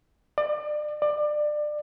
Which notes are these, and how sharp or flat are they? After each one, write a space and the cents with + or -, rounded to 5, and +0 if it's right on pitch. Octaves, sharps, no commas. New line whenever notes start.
D5 +35
D5 +25